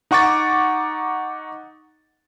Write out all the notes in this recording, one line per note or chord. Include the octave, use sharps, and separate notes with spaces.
D#4 F#5 C#6 D6 A6